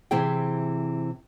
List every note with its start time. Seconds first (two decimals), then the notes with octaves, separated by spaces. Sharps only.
0.11 C3 E3 C4 E4 G#4 G5